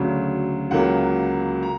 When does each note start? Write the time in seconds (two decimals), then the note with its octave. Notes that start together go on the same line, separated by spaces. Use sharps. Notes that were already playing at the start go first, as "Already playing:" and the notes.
Already playing: D2 C#3 F#3
0.71 C#2 C#3 F#3 A#3 F#5
1.63 A#5